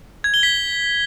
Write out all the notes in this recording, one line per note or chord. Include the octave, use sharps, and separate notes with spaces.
G#6
G7
B6